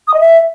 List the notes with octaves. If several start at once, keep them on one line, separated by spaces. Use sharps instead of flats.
D#6
D#5
E5